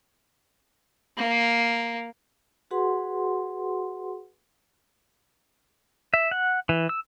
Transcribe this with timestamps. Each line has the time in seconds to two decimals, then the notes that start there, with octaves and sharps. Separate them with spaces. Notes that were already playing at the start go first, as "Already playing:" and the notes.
1.18 A#3
2.71 F#4 G#4 B4 F#5 C6
6.14 E5
6.31 F#5
6.69 E3
6.89 E6